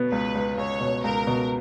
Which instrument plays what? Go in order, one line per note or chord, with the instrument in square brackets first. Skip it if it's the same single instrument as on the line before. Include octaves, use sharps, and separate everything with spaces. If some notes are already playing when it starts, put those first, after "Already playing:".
Already playing: [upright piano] B2 B3
[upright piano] C#2 [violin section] B4
[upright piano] C#2
[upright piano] C#2 [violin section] C#5
[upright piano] B2
[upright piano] C#2 [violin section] A#4
[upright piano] B2